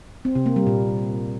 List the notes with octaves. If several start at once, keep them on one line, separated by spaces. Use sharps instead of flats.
C4
C3
A#3
G3
A#2